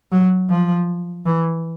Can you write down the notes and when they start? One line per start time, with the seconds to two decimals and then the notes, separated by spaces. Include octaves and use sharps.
0.12 F#3
0.50 F3
1.25 E3